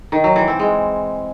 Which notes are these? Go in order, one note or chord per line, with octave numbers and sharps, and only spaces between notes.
D#3
F#3
E3
C4
G#3